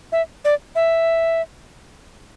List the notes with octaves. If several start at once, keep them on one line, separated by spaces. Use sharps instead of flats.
E5
D5
E5